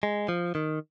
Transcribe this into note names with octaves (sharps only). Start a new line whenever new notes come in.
G#3
F3
D#3